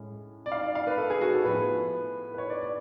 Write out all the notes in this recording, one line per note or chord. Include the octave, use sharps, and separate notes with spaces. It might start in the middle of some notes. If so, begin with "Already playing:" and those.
Already playing: A2 G#3 C#4
D5
F5
D5
F5
B4
A4
G#4
F#4
A4
A2 F3 B3 B4
B4
C#5
D5
D5